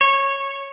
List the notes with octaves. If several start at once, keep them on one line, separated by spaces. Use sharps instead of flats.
C#5